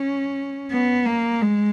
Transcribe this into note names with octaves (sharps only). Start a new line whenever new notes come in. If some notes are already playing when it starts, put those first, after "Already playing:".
Already playing: C#4
B3
A#3
G#3